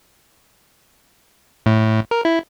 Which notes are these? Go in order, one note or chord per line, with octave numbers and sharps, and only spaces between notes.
A2
A#4
E4